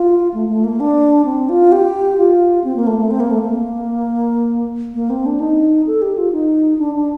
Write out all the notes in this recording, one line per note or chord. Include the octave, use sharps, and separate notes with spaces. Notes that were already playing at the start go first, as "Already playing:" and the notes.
Already playing: F4
A3
A3
A#3
D4
C4
F4
G4
F4
C4
A#3
A3
A3
C4
A#3
A3
A#3
A#3
C4
D4
D#4
A4
G4
F4
D#4
D4
D4